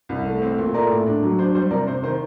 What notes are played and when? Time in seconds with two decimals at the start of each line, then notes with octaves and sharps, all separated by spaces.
0.09 C2
0.25 A3
0.42 C4
0.58 A#2
0.74 A3 A#4 D5
0.90 A2
1.06 D4
1.23 F#3
1.38 D4 C5
1.55 G3 C5
1.71 C3 A#4 D5
1.87 C3 C5
2.03 D#3 C5